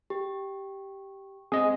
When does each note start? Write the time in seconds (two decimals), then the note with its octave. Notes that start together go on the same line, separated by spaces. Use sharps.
0.10 G4
1.52 C4 G#4 D#5